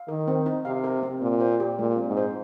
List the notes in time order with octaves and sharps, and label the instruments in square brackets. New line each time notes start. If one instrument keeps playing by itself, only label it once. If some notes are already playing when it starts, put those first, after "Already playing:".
Already playing: [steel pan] F5
[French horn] D#3 [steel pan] A#4
[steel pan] C4
D#4
[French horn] C3 [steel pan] F5
[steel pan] A#4
C4
[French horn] A#2 [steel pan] C4
[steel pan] C5
G4
[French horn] A#2 [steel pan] G#3
[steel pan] C4
[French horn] G#2
[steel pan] C5